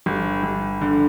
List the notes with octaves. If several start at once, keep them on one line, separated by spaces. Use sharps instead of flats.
G1
G1
D3